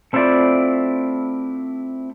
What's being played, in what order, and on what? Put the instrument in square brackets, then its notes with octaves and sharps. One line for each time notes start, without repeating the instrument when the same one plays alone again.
[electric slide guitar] A3 C4 E4 F4 D5